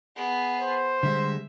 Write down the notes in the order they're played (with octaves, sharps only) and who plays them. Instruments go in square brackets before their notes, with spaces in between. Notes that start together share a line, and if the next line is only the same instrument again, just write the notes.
[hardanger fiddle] B3 G#4
[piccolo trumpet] C5
[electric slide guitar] D3 G3 G#3 [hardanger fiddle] E5